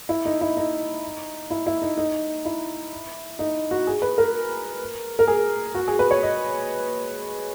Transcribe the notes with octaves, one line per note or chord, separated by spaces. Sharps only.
E4
D#4
E4
D#4
E4
E4
D#4
D#4
E4
D#4
F#4
G#4
B4
A#4
A#4
G#4
F#4
G#4
B4
C#5
D#5